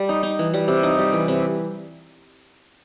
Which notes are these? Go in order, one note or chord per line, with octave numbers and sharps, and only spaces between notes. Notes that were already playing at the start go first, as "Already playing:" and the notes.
Already playing: G3
D#4
D#4
E3
G3
C3
D#4
G3
E3
C3